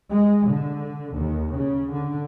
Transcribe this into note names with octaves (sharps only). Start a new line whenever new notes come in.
G#3
D3
D#2
C#3
D3